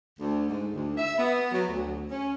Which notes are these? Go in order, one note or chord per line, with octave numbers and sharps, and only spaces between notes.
D2
G#2
D2
E5
B3
F#3
D2
C#4